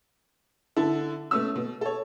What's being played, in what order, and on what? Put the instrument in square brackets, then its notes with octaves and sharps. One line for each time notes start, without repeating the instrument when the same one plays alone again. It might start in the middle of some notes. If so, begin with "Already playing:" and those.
[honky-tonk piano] D3 E4 A4
B2 A3 C#4 E6
B2
A4 C#5